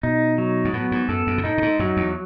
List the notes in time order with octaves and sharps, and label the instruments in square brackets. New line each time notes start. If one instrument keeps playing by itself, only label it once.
[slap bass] B2 [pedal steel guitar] D#4
[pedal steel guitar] F#3
[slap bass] G#2
[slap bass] A2 [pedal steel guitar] B3
[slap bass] G#2
[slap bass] F#2 [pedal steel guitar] A4
[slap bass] F#2
B2
[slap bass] A2 [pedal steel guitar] D#4
[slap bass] A2
G#2
[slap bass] F#2 [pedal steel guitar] F#3
[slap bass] E2